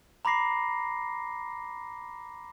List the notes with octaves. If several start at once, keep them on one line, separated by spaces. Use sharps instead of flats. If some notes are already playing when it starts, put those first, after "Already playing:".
A#5 B5 D6 A#6 C7